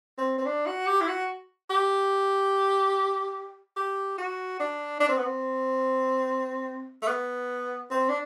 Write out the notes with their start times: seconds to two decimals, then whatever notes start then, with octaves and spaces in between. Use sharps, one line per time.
0.18 C4
0.38 C4
0.46 D4
0.66 F#4
0.86 G4
1.01 E4
1.08 F#4
1.70 G4
3.77 G4
4.18 F#4
4.60 D4
5.00 D4
5.09 C4
5.17 B3
5.24 C4
7.02 A3
7.08 B3
7.91 C4
8.09 D4